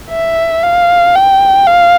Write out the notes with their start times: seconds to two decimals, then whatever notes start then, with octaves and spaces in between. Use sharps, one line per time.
0.11 E5
0.63 F5
1.15 G5
1.67 F5